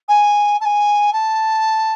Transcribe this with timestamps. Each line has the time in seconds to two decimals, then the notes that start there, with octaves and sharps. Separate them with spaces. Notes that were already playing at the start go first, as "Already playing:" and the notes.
0.08 G#5
0.60 A5
0.65 G#5
1.12 A5